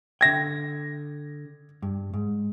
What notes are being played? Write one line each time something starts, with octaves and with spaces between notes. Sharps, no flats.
D3 E5 G5 G#6 A#6
G2
G#2